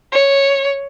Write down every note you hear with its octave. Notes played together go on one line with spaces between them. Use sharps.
C#5